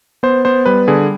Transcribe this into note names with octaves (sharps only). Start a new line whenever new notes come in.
B3 C5
B3 C5
G3 B4
D3 G#4